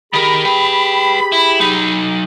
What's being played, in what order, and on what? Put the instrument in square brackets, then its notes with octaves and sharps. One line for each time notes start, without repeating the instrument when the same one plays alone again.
[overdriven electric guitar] D#3 A#4 [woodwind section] G4 G#4 B5
[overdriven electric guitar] B4 G5
E4
F#3 D#4